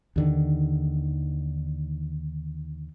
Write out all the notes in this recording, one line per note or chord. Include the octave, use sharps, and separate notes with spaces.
D#2 D3 D#3